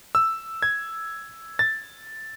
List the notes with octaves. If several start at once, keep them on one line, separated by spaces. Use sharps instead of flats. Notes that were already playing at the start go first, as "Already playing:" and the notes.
E6
G#6
A6